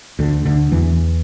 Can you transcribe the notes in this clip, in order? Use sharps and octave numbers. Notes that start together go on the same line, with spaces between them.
D2 D3
D2 D3
E2 E3